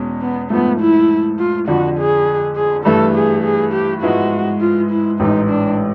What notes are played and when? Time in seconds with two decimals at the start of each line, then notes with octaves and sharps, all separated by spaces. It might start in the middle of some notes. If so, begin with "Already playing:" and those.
Already playing: E2 B2 G#3 C#4
0.21 B3
0.50 G#2 F3 A3 B3
0.80 E4
1.39 F4
1.68 F2 D3 F3 F#4
1.98 G#4
2.56 G#4
2.85 G2 E3 A3 A4
3.15 G#4
3.43 G#4
3.73 G4
4.02 G#2 F3 G#3 B3 E4 F#4
4.60 F4
4.90 E4
5.20 A1 G#2 E3 D#4
5.49 D4